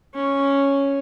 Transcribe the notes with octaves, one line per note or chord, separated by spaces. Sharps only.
C#4